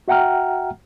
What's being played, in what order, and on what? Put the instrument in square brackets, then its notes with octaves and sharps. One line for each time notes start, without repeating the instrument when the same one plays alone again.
[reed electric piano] F#4 E5 F#5 G5 A#5 F6